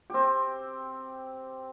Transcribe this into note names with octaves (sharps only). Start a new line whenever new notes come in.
C4 G4